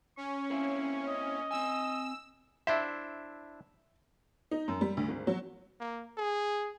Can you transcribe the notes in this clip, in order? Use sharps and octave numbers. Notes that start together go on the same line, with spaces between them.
C#4 C#6
A#3 C4 E4
D#5
C4 G#5 E6
D4 E4 C5 E5
D#4
F#2
G3
D2
G#1
F#3
A#3
G#4